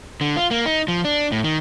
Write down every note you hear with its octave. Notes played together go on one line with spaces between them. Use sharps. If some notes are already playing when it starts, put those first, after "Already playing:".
D3
F4
A#3
D#4
F3
D4
A2
D#3